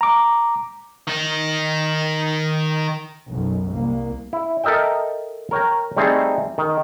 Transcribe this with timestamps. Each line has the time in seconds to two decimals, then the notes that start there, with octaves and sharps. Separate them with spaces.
0.01 A#5 D6
1.07 D#3 D#4
3.31 B1 F#2
3.72 C2 A#3
4.33 E4
4.64 A4 A#4 D#5 E5 G5
5.51 A#4 C#5 G5 A#5
5.97 G3 A3 C4 D#4 G#4 A4
6.58 D#3